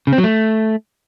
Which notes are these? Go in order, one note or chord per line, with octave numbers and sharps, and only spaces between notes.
C#3
C4
F#3
A3